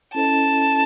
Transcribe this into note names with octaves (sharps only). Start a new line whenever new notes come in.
C#4 E4 A4 C5 D#5 A5